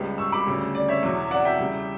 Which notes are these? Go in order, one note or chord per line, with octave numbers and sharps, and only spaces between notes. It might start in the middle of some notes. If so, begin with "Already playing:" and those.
Already playing: C#2 C#3 G3 B3
C#6 E6
B5 D6
D2 C#3 G3 C#4
D5
C#5 E5
E2 B2 F#3
D5 F#5
E5 G5
E2 C#3 G3